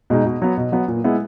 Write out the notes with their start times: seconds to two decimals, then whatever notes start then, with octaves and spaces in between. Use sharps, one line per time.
0.10 B2 G#3 D#4
0.25 B2
0.42 F#3 B3
0.57 B2
0.72 F#3 B3
0.88 A#2
1.04 G#3 B3 E4